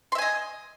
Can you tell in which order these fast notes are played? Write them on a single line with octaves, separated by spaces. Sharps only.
C6 E5 G#5 D#5